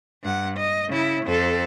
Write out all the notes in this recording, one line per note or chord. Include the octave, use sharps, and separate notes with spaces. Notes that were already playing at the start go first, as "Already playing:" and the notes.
G2 F#5
D#5
C#3 E4
F2 A4